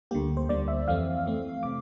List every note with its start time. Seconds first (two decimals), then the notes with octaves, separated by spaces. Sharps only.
0.11 D2 D3 G3 A#3 G4
0.37 C5
0.49 D2 D3 G3 A#3 D5
0.68 E5
0.87 F2 E3 A3 C4 F5
1.25 F2 E3 A3 C4
1.63 C3 D6